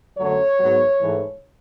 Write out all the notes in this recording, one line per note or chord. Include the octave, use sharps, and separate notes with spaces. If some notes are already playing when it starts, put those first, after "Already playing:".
F#2 D3 F#3 A3 C#5
G#2 F#3 B3
G#2 E3 A3